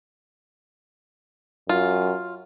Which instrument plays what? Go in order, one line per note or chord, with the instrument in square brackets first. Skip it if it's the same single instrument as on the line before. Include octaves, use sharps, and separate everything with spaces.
[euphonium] F#2 [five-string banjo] F4